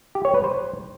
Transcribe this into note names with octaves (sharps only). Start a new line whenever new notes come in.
G4
C#5
B4
C5